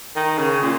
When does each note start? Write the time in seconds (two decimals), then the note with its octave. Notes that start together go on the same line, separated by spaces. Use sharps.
0.16 D#3
0.38 C#3
0.62 A#2